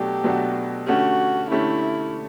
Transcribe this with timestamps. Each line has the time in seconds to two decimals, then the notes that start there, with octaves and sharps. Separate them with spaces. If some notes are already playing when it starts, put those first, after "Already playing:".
Already playing: B2 F#3 A3 D4 G4
0.24 B2 F#3 A3 D4 F#4
0.87 D3 A3 C#4 F#4 G4
1.51 D3 A3 C#4 E4 G4